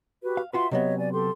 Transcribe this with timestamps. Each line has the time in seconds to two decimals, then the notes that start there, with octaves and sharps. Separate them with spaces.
0.23 F#4 G4 B4
0.37 F5
0.53 F4 F#4 B4 E5 C6
0.71 C3 F#3 B3 C#5 D#5 E5
0.98 D5 G#5
1.13 G4 A4 C6